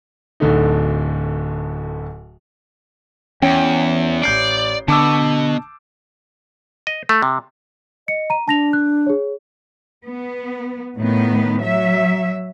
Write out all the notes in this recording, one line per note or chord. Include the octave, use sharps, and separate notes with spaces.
D1 D2 D3 A3 D#4
E2 C#4 G5
A1 D5 G6 C7
B2 D3 A5 D6 E6
D#5
A3
C3
D#5 C#7
A#5 D#7
D4 A5 A#6 F7
F#6
G#4 C#5
B3
A2 D#3 B3
F#3 E5